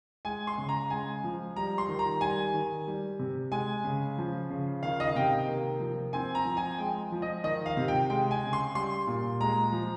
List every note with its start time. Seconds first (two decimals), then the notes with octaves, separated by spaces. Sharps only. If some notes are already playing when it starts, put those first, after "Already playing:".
0.25 G#3 G#5
0.47 C6
0.58 C#3
0.69 A#5
0.90 G#3 G#5
1.24 F3
1.56 G3 A#5
1.78 C6
1.88 D#3
1.99 A#5
2.21 G3 G#5
2.54 D#3
2.87 G3
3.19 C3
3.52 G#3 G#5
3.84 C#3
4.18 F3
4.50 C#3
4.83 D#3 F5
5.00 D#5
5.07 F5
5.16 C3 G5
5.48 A#3
5.80 F3
6.13 C4 G#5
6.35 A#5
6.46 F3
6.57 G#5
6.78 G#3 G5
7.12 F3
7.22 D#5
7.44 D#3 D#5
7.66 F5
7.77 C3
7.88 G5
8.10 G#3 G5
8.31 G#5
8.43 C#3
8.53 C6
8.75 G3 C6
9.07 A#2
9.41 G#3 A#5
9.72 F3